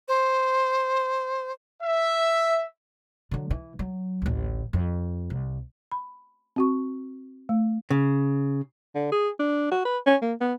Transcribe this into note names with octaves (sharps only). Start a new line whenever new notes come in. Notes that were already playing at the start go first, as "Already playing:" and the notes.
C5
E5
D3 F#3
E3
F#3
A1 D2
F2
C2
B5
C4 F#4 C#6
A3
C#3
D3
G#4
D4
F#4
B4
C#4
A#3
B3